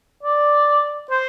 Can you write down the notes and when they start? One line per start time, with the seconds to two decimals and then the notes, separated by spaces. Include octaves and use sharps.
0.23 D5
1.11 C5